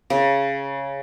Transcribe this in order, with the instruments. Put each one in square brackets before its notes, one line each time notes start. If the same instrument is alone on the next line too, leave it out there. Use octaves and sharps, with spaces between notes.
[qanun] C#3